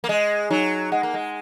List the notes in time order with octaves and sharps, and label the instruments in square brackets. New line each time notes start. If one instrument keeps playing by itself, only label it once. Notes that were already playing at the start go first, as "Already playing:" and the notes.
[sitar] A#3
[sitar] G#3 [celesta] D#5
[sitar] F#3 [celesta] D#4
[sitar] G#3 [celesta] F#5
[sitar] A#3
G#3